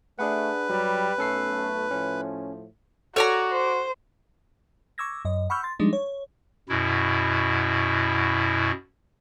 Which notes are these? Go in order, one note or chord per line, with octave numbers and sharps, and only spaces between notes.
A3 D4 G#4 B4 F#5
G2 F#3 G3 G4
B1 A3 C#4 A4 C7
A2 F3 C#4
F#4 A4 C#5 D5 A#5
C5
C#6 D6 E6 G#6 A#6
F#2 D#5
F#5 B5 C#6 E6 F6 G6
C6 A6
F3 G3 G#3 D4 D#4
C#5
F#2 B2 E4